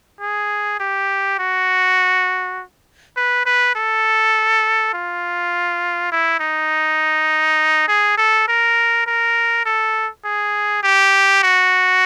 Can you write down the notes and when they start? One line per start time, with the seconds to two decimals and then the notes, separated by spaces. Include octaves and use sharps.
0.21 G#4
0.80 G4
1.39 F#4
3.17 B4
3.46 B4
3.76 A4
4.94 F4
6.12 E4
6.40 D#4
7.88 G#4
8.17 A4
8.48 A#4
9.07 A#4
9.66 A4
10.25 G#4
10.83 G4
11.43 F#4